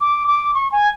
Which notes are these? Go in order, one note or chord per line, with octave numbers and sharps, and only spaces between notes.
D6
D6
C#6
G#5